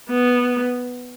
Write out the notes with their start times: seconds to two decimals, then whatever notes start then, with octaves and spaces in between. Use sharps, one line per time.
0.09 B3